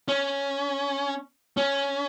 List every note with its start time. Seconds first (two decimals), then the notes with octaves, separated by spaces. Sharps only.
0.08 C#4
1.57 C#4